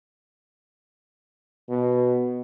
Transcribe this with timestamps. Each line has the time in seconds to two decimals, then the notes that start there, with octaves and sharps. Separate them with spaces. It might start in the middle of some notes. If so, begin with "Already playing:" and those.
1.70 B2